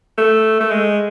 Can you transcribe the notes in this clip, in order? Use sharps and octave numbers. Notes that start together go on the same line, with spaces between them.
A3
A3
G#3